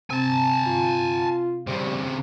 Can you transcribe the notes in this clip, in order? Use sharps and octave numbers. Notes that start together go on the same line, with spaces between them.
C3 C4 G#5 A5
F4
C#3 G3 C4